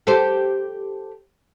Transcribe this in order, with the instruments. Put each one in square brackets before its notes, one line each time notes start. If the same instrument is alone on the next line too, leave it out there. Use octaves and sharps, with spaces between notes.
[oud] G4 A4 C5